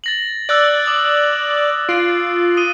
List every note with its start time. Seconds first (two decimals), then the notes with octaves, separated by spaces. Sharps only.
0.04 A6 A#6 F#7
0.49 D5 E6 F#6 A6
0.86 D6 D#6 F#7
1.89 F4 D7
2.57 D#6 D#7 G7